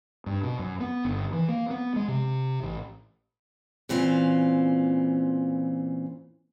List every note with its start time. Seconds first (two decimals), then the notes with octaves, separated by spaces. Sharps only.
0.26 G2
0.43 B2
0.59 F#2
0.80 B3
1.05 G1
1.33 E3
1.49 A#3
1.71 B3
1.96 G#3
2.08 C3
2.63 A1
3.89 A#2 E3 C4 C#4 F4